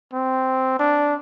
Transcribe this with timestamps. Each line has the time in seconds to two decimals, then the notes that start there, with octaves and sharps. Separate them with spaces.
0.13 C4
0.80 D4